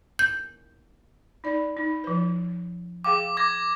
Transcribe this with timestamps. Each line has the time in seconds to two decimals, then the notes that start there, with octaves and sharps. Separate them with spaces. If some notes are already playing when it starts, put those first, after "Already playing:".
0.19 G6
1.44 D#4 D5
1.77 D#4
2.04 F3 B4
3.04 G#4 F5 G5 D6
3.37 D6 G#6 A#6